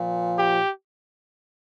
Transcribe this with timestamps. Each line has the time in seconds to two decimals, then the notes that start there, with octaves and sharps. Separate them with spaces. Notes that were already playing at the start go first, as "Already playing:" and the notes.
Already playing: A#2 F3
0.38 G4